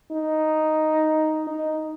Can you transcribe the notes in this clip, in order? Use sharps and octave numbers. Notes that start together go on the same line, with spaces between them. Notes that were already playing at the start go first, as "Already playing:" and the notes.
D#4
D#4